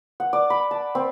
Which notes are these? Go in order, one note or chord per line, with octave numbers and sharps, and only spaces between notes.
F#5
D5
B5
A5
C4